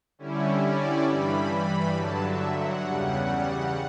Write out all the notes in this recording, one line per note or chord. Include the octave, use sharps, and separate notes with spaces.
D3 G3 C#4 E4
D5
G2 E3 G3 B5
B5
G2 D3 F#3 A5
E5
F#5
E2 C#3 G3